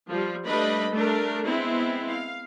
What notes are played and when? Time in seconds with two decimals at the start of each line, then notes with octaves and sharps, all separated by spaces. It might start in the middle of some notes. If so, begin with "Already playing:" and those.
0.10 F3 G3
0.46 G3 A3 D4 B4 D#5 B5
0.91 A3 D4 A#4
1.44 G#3 B3 C4 E4
2.09 F5